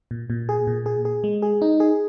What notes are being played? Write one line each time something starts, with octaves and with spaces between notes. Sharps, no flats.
A#2
A#2
G#4
A#2
G#4
G#4
G#3
G#4
D#4
G#4